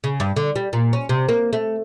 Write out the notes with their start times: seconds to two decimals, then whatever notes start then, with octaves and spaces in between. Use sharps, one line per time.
0.04 C#3
0.20 G2
0.36 D3
0.56 G3
0.73 A#2
0.93 C#4
1.09 C3
1.29 A#3
1.53 A3